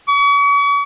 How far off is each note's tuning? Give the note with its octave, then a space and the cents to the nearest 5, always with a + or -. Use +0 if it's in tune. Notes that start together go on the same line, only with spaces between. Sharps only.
C#6 +40